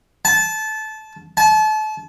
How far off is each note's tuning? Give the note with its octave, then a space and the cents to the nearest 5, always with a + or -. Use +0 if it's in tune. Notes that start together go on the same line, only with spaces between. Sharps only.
A5 -20
A5 -35